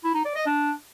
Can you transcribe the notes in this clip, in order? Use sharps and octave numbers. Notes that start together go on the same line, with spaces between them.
E4
D#4
D5
D#5
D4